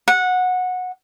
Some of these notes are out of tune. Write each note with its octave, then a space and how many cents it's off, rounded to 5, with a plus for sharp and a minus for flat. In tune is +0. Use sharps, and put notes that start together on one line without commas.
F#5 -15